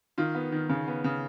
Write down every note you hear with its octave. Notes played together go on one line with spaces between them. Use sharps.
D#3 F4
B3
D#3
C#3
B3
C#3